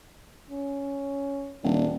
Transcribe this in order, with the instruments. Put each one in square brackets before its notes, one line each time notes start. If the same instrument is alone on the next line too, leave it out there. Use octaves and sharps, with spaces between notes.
[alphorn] C#4
[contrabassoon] D#1 [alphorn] D4